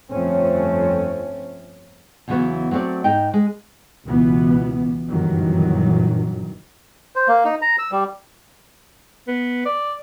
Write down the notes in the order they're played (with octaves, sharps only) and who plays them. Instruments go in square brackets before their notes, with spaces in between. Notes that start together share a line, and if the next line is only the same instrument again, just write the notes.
[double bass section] G1 F2 A3 C4 C#4
[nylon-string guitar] E2 C#3 E3 F#3 B3 F#4
F#3 A3 C4 F#4 D5
G#2 D#4 G5
G#3
[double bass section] C#2 B2 E3 B3
G1 F#2 A#2 D#3 E3 F#3
[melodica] C5
A#3
D#4
A#5
E6
G3
[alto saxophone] B3
D5